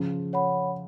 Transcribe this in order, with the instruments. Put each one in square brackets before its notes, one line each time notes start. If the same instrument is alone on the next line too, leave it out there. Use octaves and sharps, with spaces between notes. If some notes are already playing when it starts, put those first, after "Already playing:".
Already playing: [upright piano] C#3 F3
[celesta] C#5 F#5 B5